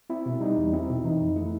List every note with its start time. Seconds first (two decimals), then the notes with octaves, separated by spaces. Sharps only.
0.10 C4 E4
0.26 B2
0.41 G3 D#4
0.57 E2
0.73 C4 E4
0.90 B2
1.04 E3 D#4
1.21 F2
1.36 A3 E4